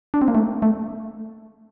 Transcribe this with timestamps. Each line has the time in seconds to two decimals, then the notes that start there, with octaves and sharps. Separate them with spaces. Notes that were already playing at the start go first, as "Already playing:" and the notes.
0.14 D4
0.22 C4
0.28 A#3
0.35 A3
0.62 A3